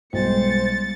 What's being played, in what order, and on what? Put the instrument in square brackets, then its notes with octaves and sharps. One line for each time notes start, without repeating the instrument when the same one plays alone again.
[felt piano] B1 [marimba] G3 G#3 [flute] C5 [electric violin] A6 C#7